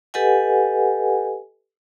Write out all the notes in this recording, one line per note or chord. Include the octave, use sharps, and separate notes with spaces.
G4 A4 B4 D#5 F#5 G#5